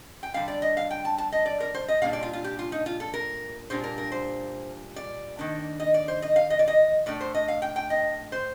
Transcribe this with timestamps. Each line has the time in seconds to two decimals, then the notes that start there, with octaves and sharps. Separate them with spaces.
0.23 G5
0.34 D3 G3 D4 F5
0.48 D5
0.62 D#5
0.77 F5
0.91 G5
1.05 A5
1.18 A5
1.32 D#5
1.46 D5
1.60 A#4
1.74 C5
1.88 D#5
2.02 A#2 G3 A#3 D4 F5
2.13 D5
2.23 F4
2.33 F4
2.44 G4
2.59 F4
2.72 D#4
2.86 F4
3.00 A4
3.14 A#4
3.70 A#2 G3 A#3 D4 C5
3.84 A#4
3.98 A#4
4.12 C5
4.96 D5
5.39 D#3 A#3 D4
5.80 D#5
5.94 D5
6.08 C5
6.22 D#5
6.36 F5
6.50 D#5
6.59 D5
6.68 D#5
7.06 A2 A3 D4 D5
7.21 C5
7.35 D#5
7.48 F5
7.62 G5
7.76 G5
7.90 D#5
8.32 C5